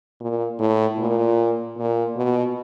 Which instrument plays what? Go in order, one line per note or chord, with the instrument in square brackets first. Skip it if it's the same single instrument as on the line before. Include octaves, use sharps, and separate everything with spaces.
[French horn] A#2
A2
A#2
A#2
B2